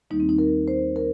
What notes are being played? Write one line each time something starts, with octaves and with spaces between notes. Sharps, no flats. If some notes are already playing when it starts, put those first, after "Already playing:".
D#2 D#3 G3 A#3 D#4
C4
D#4
A#4
C5
A#4